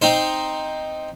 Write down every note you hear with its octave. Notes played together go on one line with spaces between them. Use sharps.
C4 D#4 C5